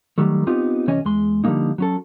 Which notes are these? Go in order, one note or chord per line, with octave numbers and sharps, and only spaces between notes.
D#3 F#3 G3 A3
B3 C4 D#4 F4 G4
C2 E3 C#4 C#5 D#5 G#5
E2 G#3 C6
D3 F3 G3 G#3 A#3 D#4
F#3 C#4 A4